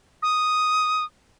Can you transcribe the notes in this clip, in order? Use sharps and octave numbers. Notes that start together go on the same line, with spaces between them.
D#6